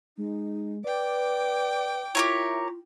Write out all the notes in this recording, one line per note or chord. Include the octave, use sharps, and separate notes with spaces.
G#3 D#4
B4 D5 G5 D6
E4 F4 G4 A#4 C#5